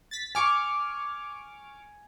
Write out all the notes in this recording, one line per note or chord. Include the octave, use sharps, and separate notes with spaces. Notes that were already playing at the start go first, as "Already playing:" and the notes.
A6 B6
G#5 C#6 D6 F6